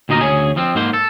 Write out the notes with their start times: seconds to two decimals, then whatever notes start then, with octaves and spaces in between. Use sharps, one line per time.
0.09 D2 A#2 D#4 F#4 A#4
0.21 D2 C#4 G#4
0.57 F3 C4
0.75 G#2 A#3 C5
0.93 A4